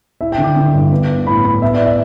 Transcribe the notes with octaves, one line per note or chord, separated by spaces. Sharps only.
E4 E5
G5
D3
D6
D3
G2
B3
B3
A2 B5
A2 B5
B3 E5
D5
E5